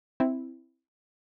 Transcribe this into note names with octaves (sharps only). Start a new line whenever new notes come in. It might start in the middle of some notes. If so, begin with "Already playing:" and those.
C4 E4